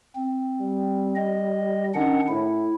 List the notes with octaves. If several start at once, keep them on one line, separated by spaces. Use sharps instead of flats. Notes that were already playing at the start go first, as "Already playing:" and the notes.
C4
G3
D#5
D#3 C#4 D4 F#5
A2 E4